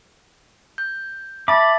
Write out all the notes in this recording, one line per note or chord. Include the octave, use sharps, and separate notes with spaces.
G6
E5 A5 B5 D6 A6